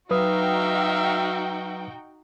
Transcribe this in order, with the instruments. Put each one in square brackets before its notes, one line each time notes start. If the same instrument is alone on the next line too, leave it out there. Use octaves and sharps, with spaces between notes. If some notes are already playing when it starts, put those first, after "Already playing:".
[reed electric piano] F#3 B4 D#6 [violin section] D#4 F#4 G5 [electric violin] E5 F5